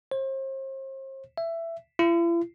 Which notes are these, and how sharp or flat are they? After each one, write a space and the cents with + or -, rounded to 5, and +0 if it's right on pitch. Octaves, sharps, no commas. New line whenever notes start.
C5 +40
E5 +15
E4 +45